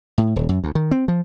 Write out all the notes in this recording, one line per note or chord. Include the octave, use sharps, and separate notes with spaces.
A2
D#1
F#2
D2
D#3
C4
F3